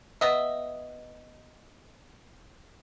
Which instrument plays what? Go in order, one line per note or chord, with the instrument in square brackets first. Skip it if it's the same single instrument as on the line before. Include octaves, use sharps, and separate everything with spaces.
[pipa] B3 D#5 E5